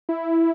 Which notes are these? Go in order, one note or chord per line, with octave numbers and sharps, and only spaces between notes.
E4